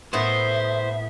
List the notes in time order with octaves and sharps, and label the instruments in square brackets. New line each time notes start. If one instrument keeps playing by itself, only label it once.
[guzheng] A2 B3 G#4 [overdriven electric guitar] C5 [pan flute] E5